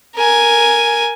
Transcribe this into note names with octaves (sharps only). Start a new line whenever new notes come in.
A#4 G#5